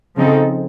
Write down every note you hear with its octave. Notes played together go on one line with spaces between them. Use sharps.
C#3 F3 C4 D#4 A4